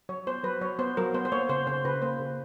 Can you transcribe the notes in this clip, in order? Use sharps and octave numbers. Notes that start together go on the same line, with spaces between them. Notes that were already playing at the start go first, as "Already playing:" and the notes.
F#3 C#5
B3 C5
F#3 B4
F#3 C#5
B3 C5
F#3 A#4
B3 C5
C5
A#3 C#5
C#3 C5
C#3 C5
C#3 B4
A#3 C5
C#3